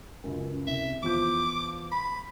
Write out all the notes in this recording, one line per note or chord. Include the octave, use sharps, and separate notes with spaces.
C#2 F#2
C2 E5
E2 F3 D6 G6
B5